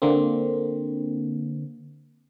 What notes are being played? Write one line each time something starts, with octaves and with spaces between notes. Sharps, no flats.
D3 A#3 C4